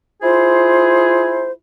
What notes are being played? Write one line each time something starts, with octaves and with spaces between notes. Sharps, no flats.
E4 F4 G#4 C5